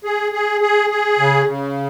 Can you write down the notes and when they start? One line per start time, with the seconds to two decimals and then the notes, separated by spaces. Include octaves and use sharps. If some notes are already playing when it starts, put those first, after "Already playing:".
0.04 G#4
0.32 G#4
0.61 G#4
0.90 G#4
1.19 C#3
1.46 C#3